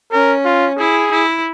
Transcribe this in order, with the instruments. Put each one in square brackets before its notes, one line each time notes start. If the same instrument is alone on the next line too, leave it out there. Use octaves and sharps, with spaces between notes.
[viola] C#4 [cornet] A#4
[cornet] F4
[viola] E4 [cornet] G#4
[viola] E4